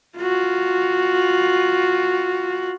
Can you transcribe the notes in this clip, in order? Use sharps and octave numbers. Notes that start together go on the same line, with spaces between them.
F4 F#4